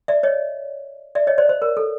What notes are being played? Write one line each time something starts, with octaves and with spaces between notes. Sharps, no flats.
D5 E5
C#5 D#5
D5 E5
C#5 D#5
C5 D5
C5
A#4
A4